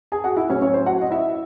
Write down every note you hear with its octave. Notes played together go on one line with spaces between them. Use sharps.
G#4 G#5
F#4 F#5
E4 E5
A2 F#3 C4 C#4 C#5
C#4 C#5
C5
F#4 F#5
D#5
E4 E5